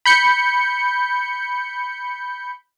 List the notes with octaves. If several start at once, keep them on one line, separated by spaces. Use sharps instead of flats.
B5 G6 C#7